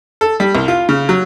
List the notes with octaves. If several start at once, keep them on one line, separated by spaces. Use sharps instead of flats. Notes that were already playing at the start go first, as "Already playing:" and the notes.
A4
G3
C2
F4
C#3
F#3